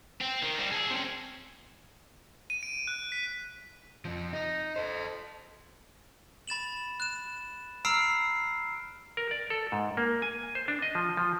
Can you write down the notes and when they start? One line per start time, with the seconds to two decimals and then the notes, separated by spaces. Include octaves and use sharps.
0.21 C4
0.43 D#3
0.58 G3 C4
0.72 G#4 A4
0.90 C4 C#4
2.50 D#7
2.63 D7
2.87 F#6
3.12 B6
4.05 F2 F3
4.33 D#4
4.76 A4 C5
6.48 B5 A6 E7 F#7
7.00 F#6 E7
7.85 A#5 B5 E6 F6 C7 D7
9.17 A#4
9.31 D5
9.50 A4
9.72 G#2
9.97 A#3
10.22 G#5
10.55 C5
10.68 D4
10.82 D#5
10.95 F3
11.17 F3